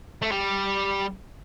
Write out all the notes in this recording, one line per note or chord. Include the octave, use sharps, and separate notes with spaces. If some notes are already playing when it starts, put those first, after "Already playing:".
A3
G3